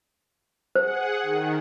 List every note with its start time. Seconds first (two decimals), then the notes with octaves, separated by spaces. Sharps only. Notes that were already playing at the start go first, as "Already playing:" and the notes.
0.75 G#4 C5 F#5
1.23 D#3